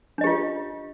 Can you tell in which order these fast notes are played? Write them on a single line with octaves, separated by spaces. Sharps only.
D4 D#5 G4 F4